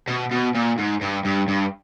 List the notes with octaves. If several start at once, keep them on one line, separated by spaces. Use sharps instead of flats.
B2
B2
A#2
G#2
G2
G2
G2